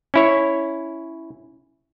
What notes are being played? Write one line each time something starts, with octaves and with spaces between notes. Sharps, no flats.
C#4 E4 C#5